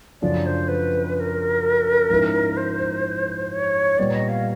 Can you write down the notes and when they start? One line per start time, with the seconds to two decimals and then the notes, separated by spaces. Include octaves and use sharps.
0.22 F#2 C#3 F3 A3 D4 D5
0.46 C5
0.68 B4
1.16 B4
1.20 A#4
2.10 G#2 F3 G#3 C#4 E4
2.57 C5
3.52 C#5
3.98 A#2 G3 B3 D5
4.14 D#5
4.29 F5